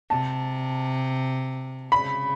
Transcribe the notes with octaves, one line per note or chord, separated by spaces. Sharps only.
C3 A5
C#3 B5